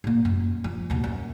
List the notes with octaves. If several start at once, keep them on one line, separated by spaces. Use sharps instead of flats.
A#2 A#3
F#2
F3
D#2 B2
F#2